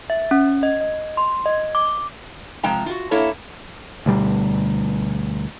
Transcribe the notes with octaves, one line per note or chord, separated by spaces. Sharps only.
E5
C#4
D#5
D#5
C6
D#5
D6
C3 F3 G#3 G5 A#5
F4 F#4
A#3 E4 A4 C#5
D2 B2 G3